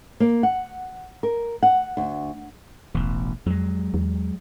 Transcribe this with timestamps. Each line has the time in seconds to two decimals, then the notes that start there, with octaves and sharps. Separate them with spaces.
0.20 A#3
0.43 F#5
1.23 A#4
1.63 F#5
1.97 D2
2.95 D#1 A1 B2
3.46 F2 F#3 G#3
3.94 E2